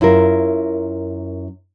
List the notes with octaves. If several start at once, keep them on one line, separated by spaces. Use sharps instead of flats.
F#2 E4 F4 A#4